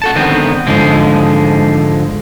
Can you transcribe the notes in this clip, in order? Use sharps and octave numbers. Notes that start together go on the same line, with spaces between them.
F#4 A4 A5
D3 D#3 B3 C4
G#2 D3 F3 G#3